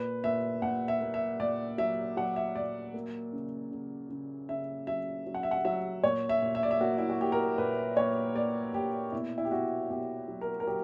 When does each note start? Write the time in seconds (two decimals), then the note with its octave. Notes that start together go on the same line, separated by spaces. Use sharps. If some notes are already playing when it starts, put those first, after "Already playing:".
Already playing: A#2 B4
0.24 A#2 E5
0.62 A#2 F#5
0.88 E5
1.01 A#3
1.14 E5
1.40 A#2 D5
1.78 F#3 E5
2.17 F#3 F#5
2.36 E5
2.55 A#2 D5
2.94 A#3
3.33 C#3
3.71 C#3
4.10 C#3
4.49 C#3 E5
4.87 F#3 E5
5.27 F#3
5.34 F#5
5.43 E5
5.51 F#5
5.65 F#3 E5
6.04 A#2 C#5
6.29 E5
6.42 A#2
6.55 E5
6.63 D5
6.71 E5
6.80 A#3 F#4
6.98 E4
7.09 F#4
7.19 A#3 G4
7.32 A#4
7.58 A#2 B4
7.97 A#2 C#5
8.35 A#3 D5
8.74 A#2 G4
9.12 B2 E4
9.38 E4
9.45 G4
9.51 B2 F#4
9.90 B2 G4
10.28 F#3
10.41 A#4
10.60 A#4
10.67 F#3 G4